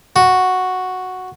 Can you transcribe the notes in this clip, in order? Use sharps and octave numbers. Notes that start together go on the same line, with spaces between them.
F#4